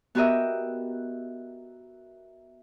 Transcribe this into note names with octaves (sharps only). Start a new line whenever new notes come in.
B3 F#4 G4 A#4 D#5 E5